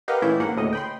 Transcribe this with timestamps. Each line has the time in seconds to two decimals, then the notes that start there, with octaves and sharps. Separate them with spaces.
0.08 G4 A#4 B4 D#5 F5 F#5
0.22 A#2 E3 A3 C#4 E4 G6
0.40 G#2 A#3 F#5
0.56 D2 A2 C#3 D#5
0.73 G5 B5 C6